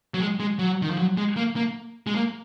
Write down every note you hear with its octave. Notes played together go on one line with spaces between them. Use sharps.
F#3
G#3
G#3
F#3
D#3
F3
F#3
G#3
A#3
A#3
G#3
A#3